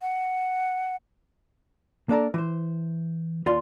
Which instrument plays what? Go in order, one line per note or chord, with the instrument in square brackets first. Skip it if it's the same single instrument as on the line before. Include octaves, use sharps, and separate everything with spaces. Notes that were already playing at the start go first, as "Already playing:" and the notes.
[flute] F#5
[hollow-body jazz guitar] A#3 D4 A4 A#4
E3 C5
D#2 F4 D5 F5 C6